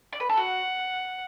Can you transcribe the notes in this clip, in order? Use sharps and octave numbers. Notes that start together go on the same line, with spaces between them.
D5
B4
A4
F#4 F#5